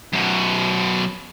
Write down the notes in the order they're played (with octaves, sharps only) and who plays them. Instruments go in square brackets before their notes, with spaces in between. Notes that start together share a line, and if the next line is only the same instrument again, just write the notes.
[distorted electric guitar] F#2 B2